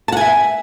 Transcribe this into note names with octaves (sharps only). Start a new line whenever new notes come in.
E5 F#5 G#5 A5